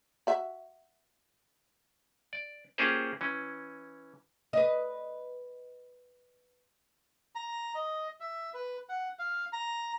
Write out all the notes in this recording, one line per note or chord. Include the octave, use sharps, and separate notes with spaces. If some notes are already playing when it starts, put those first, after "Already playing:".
F#4 E5
D5
A#3 C#4 F4 G4 G#4 C5
E3 C#4
B4 D#5
A#5
D#5
E5
B4
F#5
F5
A#5